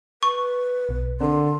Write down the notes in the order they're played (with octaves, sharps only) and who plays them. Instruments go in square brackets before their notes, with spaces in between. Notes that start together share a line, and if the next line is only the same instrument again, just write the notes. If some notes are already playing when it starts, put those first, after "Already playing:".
[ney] B4 [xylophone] C#6
[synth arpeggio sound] B1 B2
[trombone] D3 [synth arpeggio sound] C4 A#4 [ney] C6